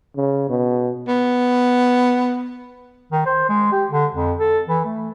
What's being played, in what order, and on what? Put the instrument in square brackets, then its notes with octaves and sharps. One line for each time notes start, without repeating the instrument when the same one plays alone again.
[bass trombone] C#3
B2
[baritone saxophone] B3
[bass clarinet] D#3
C5
G#3
G4
D3
F2
A4
E3
A3